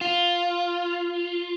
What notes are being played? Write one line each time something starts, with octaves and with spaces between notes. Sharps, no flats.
F4